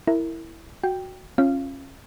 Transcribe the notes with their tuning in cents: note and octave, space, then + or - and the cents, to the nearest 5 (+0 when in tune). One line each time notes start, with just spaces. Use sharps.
E4 +0 A#4 -20
F#4 +0 G5 +0
C#4 -25 F4 +0 F5 -15